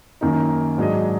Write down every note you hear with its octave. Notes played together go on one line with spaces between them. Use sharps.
F#2 D#3 A#3 D#4
G#2 F#3 D4 G#4 D#5